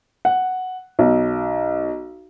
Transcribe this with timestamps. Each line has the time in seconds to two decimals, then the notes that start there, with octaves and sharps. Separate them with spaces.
0.25 F#5
0.99 B1